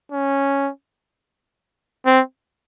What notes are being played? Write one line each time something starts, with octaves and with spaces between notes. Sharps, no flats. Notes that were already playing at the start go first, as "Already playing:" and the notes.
C#4
C4